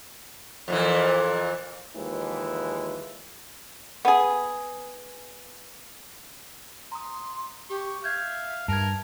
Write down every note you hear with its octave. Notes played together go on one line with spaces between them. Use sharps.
F2 A#2 E3
D#2 E3 F3 G#3
B3 G#4
A#5 C6 D#6
G4 C#6
E5 F5 G6 G#6
G2 A#4 A5 G#6